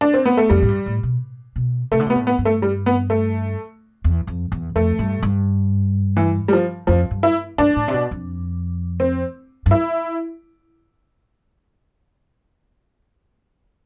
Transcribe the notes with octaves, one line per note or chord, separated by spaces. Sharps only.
D4
C4
B3
A3
F2 G3
A2
G2
A2
B2
B2
C3 A3
D3
C3 B3
A2
B3
G2
A3
G3
B3
A3
E2
F2
E2
F2 A3
G2
G2
E3
G3
F3
F2 F3
G2
E4
G2 D4
A2
C3
B2
F2
C4
G2
E4